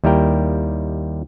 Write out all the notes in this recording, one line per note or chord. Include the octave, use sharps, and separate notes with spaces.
D#2 G3 E4 A#4 G5